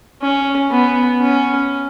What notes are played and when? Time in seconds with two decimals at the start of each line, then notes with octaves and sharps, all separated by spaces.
0.22 C#4
0.71 B3
1.21 C#4